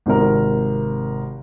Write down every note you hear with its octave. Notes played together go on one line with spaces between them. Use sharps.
G#1 C3 A#4